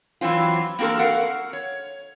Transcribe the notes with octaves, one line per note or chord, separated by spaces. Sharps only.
E3 F#3 C4 F4
A#3 C4 F#4 A4 A#4
A#4 F5 F#5
C#5